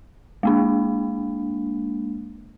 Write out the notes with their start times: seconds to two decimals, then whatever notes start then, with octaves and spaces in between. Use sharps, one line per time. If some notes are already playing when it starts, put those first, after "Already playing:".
0.43 G#3 A#3 D4